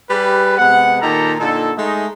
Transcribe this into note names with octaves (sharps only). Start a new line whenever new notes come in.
G3 G4 G#4 B4
C3 G#3 B3 F#5
A#2 D#3 D#4 G4 A4 A#5
A#2 D3 D#4 A4
G#3 A3 D#4